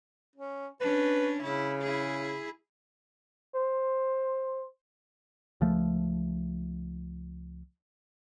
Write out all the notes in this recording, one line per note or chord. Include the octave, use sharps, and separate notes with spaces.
C#4
C#4 D4 B4
C#3 E4
E4 G#4
C5
C#2 F3 A3